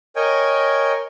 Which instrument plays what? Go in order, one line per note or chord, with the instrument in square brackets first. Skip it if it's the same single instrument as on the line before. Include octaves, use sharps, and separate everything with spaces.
[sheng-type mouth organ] A#4 C#5 D#5 G5 G#5